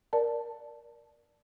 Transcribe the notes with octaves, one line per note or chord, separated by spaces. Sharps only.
A#4 D5 A5